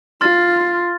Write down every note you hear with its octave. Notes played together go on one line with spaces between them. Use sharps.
F4 C6 F6 A6